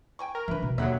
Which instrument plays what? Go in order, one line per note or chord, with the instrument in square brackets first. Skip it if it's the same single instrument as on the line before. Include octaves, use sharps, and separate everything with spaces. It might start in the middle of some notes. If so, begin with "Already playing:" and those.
[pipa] G5 G#5 C#6
[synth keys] A#4
[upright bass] E3 D4 [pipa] E4 B4
[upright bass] B2
[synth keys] D#2 D3 F#3 [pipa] E5 F#5